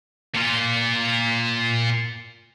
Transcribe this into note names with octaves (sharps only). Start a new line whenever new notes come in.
A#2 F4